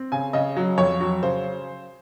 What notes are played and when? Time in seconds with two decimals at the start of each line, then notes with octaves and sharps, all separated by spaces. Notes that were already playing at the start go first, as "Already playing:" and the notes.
Already playing: C4
0.12 C#3 G#5
0.33 C#3 D#5
0.57 F#3
0.78 F2 C#5
1.01 F#3
1.23 C#3 C5